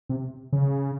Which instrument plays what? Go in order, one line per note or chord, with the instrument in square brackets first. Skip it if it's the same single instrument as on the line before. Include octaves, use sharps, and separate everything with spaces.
[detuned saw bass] C3
C#3